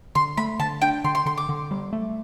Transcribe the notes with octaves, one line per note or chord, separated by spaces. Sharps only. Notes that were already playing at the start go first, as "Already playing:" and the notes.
D3 C6
A3 B5
D3 A5
D4 G5
D3 C6
C6
D3 C6
D6
D3
G3
A3